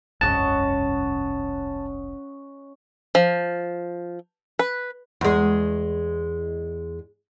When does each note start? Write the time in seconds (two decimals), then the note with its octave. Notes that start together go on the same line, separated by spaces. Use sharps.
0.21 F1 C2 G2 C#4 D#5 F#5 A5
3.15 F3
4.59 B4
5.21 E2 G#3